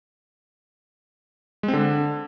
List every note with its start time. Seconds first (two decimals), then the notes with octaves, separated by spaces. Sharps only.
1.63 G#3
1.68 C4
1.73 D3